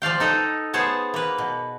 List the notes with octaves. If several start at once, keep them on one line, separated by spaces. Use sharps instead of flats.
F3 D5 F5 G5
D#4 A4 D#5
B3 G#4 C5 C#5 A5
A#3 B4
B2